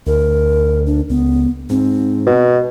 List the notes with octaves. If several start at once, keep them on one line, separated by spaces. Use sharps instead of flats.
D2 A#4
D4
C#2 B3
G#2 C4
B2